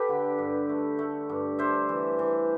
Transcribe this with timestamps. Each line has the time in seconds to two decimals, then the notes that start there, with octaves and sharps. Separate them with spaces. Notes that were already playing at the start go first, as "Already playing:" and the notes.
Already playing: G4 A4 B4
0.09 D3
0.38 G2
0.69 A3
0.99 A3
1.29 G2
1.59 D4 C5 E5
1.89 E3
2.19 E3